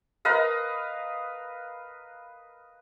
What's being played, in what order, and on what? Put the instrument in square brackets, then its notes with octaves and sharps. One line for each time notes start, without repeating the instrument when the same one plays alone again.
[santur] A#4 B4 D#5 F5